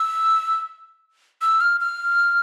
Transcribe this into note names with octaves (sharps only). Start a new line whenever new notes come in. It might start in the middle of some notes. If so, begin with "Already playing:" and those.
Already playing: E6
E6
F6
F6